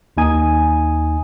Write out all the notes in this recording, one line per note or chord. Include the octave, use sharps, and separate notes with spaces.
D#2 D#4 G#5 D#6